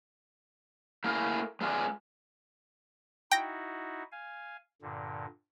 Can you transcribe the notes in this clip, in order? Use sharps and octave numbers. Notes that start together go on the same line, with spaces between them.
A3 A#3 E4 G#4 A#4 F5
G#3 B3 F4 G#4 D5
D#4 E4 F#4 G5 A#6
F5 G#5
G2 A#2 D3